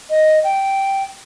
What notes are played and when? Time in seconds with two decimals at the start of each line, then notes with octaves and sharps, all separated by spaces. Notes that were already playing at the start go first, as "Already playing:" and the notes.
0.10 D#5
0.44 G5